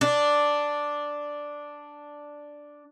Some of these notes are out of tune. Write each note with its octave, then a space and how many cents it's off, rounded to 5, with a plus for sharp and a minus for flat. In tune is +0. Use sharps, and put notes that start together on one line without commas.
D4 +0